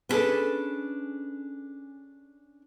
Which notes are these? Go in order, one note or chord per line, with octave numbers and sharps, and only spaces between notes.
B3 C#4 D4 G#4 A4 B4